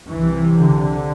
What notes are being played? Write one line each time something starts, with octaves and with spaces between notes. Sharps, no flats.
C2 C3 E3
D3